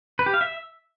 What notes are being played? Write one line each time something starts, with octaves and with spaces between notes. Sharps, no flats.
B4
G4
F5
E5